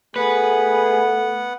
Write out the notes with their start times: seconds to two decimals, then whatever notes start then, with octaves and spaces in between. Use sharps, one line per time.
0.16 A3 B3 G#4 B4 F#5